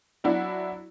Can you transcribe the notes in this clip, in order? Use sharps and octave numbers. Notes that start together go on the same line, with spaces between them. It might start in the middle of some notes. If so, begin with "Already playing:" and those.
F#3 D4 E4 F#4